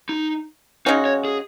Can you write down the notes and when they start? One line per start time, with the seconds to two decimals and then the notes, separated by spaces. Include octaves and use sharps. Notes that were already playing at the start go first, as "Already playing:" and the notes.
0.09 D#4
0.86 C#3 G#3 C#4 D#4 F#4
1.05 C#5
1.25 G#4